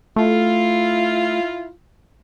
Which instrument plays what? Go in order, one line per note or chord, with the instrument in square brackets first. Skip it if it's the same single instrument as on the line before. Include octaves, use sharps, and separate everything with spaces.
[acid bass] A3 [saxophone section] E4 F4